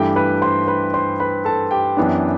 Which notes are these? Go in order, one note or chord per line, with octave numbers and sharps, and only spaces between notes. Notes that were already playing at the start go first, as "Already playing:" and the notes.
Already playing: G2 E3 A3 G4 G5
B4 B5
C5 C6
B4 B5
C5 C6
B4 B5
A4 A5
G4 G5
F#2 E3 B3 D4